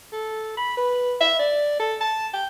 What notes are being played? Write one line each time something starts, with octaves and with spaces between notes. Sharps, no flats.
A4
B5
B4
E5
D5
A4
A5
G5